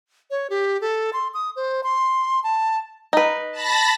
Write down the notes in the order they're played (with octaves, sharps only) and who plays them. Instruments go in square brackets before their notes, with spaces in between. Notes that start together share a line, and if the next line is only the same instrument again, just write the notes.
[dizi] C#5
G4
A4
C6
D#6
C5
C6
A5
[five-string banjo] D#4 B4
[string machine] A5 B5 A#6